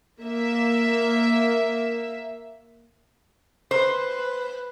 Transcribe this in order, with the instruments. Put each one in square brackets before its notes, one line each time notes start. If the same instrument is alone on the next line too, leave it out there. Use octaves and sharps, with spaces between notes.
[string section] A#3 E5
[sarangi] B4 [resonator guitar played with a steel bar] C5